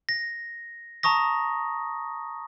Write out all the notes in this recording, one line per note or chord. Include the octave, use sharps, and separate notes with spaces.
A#6
A5 A#5 C#6 D#6 A#6